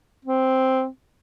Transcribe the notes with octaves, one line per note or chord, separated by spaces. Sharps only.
C4